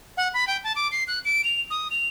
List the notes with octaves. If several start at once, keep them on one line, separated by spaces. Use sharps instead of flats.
F#5
B5
G5
A5
D6
C7
F#6
D7
F7
D#6
F7